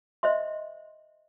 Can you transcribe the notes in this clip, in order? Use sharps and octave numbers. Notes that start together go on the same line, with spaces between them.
C5 D#5 E5 C6